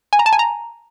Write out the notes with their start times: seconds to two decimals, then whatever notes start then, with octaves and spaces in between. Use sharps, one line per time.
0.13 G#5
0.19 A#5
0.26 A5
0.33 G#5
0.39 A#5